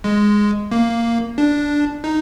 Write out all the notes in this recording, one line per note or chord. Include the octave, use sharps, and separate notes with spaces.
G#3
A#3
D4
D#4